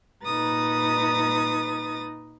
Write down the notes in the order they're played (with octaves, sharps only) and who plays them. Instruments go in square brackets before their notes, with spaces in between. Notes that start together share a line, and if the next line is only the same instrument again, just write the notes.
[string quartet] A#2 D#4 B4 A#5 D#6 A6